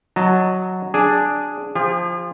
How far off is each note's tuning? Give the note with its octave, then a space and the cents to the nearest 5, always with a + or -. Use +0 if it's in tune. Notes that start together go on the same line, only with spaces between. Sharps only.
F#3 +0 D#5 +0 A5 +20
D4 +0 G#4 +0
F3 +0 G#4 -45